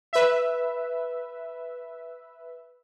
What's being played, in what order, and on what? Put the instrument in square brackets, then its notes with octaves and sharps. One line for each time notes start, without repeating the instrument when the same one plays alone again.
[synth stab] B4 E5